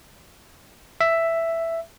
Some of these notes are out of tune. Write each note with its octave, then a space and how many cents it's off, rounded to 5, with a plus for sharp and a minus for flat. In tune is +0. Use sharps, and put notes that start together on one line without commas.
E5 +5